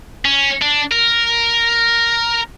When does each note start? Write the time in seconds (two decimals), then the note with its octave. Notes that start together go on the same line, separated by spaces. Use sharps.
0.25 C#4
0.62 D4
0.92 A#4